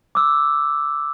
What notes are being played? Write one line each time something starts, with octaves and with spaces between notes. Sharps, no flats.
D6 E6